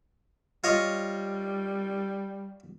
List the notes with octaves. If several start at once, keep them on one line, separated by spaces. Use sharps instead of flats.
G3 F4 C#5 D#5